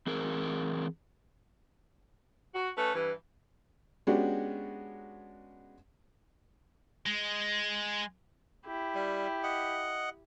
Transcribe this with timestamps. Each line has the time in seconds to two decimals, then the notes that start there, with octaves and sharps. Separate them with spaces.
0.07 E3 C4 G#4 A#4
2.54 F#4
2.76 A3 C#4 B4
2.93 G2 E3
4.07 G#3 B3 C#4 D4 F#4 G4
7.06 G#3
8.66 E4 G4
8.95 G3
9.43 D#5 F#5